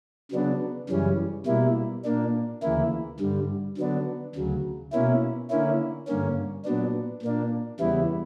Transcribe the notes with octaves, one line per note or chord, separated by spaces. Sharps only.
C#3 F#3 B3 D4
F#2 C#3 E3 G3 C#4
B2 G3 A#3 E4
A#2 A#3 D4
D2 C#3 E3 A#3 E4
G2 D3 G3
D3 F#3 B3 D4
D2 C#3 F#3
B2 A#3 C#4 E4
D3 A#3 C#4 E4
G2 D3 A#3 C#4
A#2 F#3 B3 D4
A#2 A#3 D4
E2 C#3 G3 B3 E4